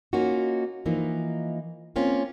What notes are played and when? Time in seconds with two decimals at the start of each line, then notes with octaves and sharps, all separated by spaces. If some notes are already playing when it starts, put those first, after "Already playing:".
0.13 A#3 C#4 D#4 F4 F#4
0.86 E3 F3 A#3 D#4
1.96 A#3 C4 C#4 F4